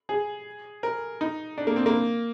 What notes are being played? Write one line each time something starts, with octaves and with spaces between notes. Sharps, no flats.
G#4
A#4
D#4
D4
A#3
C4
A#3